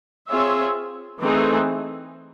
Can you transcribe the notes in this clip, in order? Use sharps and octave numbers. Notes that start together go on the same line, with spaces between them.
C4 F4 G#4 C#5 E5
E3 A3 C4 D#4 G#4